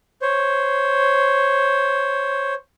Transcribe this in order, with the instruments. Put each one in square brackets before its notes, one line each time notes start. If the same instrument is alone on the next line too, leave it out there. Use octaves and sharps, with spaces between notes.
[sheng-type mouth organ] C5 C#5